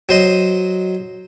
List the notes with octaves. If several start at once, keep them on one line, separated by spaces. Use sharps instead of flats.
F#3 C5 D#5